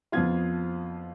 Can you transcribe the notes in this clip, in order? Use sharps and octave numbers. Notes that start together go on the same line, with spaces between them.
F2 F3 B3 F4 G#6